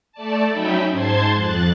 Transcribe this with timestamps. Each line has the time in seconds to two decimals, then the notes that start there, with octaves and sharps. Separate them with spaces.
0.12 A3 D5 A5
0.50 F#3 C#4 D#4 E5 G5 B5
0.91 G#2 C5 A5 C6 G#6
1.33 F2 F#6 A6